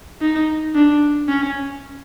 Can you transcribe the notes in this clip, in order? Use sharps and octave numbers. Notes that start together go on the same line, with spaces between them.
D#4
D4
C#4